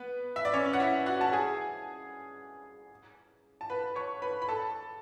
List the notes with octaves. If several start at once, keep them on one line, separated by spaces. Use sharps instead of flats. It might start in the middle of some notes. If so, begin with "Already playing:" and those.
Already playing: B3 B4
E5
D5
C#4 C#5
F#5
E4 E5
F#4 F#5
A5
G#4 G#5
A5
B4 B5
C#5 C#6
B4 B5
B5
A4 A5